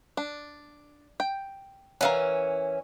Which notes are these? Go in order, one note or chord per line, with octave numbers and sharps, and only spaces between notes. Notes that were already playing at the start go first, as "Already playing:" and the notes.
D4
G5
E3 C#4 A#4 F5 F#5